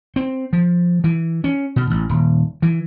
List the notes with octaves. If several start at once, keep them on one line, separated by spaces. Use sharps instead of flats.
C4
F3
E3
C#4
B2
A1
D#1
E3